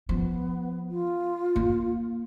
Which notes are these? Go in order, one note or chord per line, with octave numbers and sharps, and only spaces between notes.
F3 B3
F4
A#3